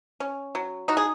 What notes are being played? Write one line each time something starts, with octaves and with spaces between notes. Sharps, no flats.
C#4
F#3
D#4 F#4
G#4